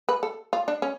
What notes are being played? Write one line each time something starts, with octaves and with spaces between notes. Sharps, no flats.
B4
A4
F4
D4
C#4